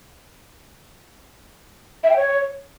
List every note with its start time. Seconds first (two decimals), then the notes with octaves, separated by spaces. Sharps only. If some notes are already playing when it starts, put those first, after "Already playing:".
2.04 E5
2.10 G5
2.16 C#5